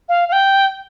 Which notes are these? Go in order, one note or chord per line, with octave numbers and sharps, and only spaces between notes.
F5
F5
G5